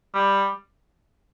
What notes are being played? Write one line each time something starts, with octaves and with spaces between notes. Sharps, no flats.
G3